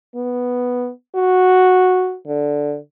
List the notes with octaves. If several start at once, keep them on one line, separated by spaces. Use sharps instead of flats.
B3
F#4
D3